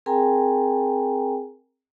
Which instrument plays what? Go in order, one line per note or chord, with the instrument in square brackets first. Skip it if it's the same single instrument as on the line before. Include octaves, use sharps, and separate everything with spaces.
[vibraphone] C4 G#4 A#4 G5 G#5 A#5